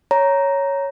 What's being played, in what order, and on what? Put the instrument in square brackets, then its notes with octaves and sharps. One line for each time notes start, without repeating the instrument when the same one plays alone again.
[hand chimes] C#5 A#5